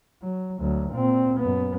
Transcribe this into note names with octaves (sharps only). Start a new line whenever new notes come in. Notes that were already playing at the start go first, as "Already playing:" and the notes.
F#3
D2 F#3
A#2 C4
F#2 B3